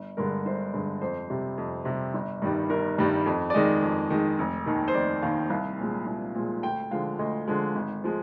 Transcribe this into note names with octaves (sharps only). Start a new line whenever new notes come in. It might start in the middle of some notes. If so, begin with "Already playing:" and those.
Already playing: G1
G2 D3 G#3 A#4
G1 C5
G2 D3 G#3
F2 C5
C3 G3
F2
C3 G3
G1
G2 D#3 G3
G1 A#4
G2 D#3 G3
F2
D5
D#3 G#3 D#5
F2
D#3 G#3
F1
D#2 D#3
C5
F1 D5
D#2 D#3 F5
C2 F5
A#2 F3 G#3
C2
A#2 F3 G#3
D2 G5
D3 F3 G#3 F5
D2 D#5
D3 F3 G#3
G#1
F3 G#3